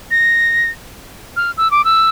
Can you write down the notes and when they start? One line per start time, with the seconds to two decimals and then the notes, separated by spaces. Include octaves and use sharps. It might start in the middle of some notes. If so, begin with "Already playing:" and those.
0.11 A#6
1.36 F6
1.57 E6
1.71 D6
1.84 E6